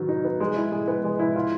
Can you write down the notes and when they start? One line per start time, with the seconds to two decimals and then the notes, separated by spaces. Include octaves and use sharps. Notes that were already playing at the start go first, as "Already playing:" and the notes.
Already playing: D#3 F#3 B3
0.09 D#4
0.24 B3
0.40 G#3
0.56 E4
0.72 G#3
0.88 B3
1.04 G#3
1.19 E4
1.36 F4